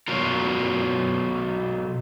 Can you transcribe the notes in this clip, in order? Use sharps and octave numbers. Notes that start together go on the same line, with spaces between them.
B2 F#3 F4 A#4